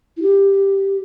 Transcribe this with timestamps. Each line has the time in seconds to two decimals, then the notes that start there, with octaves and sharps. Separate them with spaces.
0.17 E4
0.22 G4